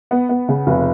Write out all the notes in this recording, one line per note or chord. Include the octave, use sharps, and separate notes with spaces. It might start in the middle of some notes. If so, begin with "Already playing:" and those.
B3
B3
C#3
F1